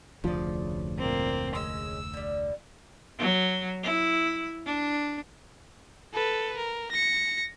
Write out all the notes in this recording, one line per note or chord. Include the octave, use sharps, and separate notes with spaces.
F1 D2 C#3 F3 D5
A#2 A#3 C4
G#3 C#4 D#5 E6
D3 G3
F#3
E4
D4
A4 B4
A#4
A#6 C#7